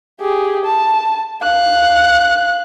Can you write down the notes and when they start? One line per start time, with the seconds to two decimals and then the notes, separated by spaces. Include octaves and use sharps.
0.20 G4 G#4
0.65 A5
1.42 F5 F#6